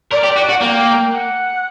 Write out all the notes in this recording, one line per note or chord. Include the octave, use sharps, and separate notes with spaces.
A#4 D5
G4
F#4
F#4
A#3 G5
F#5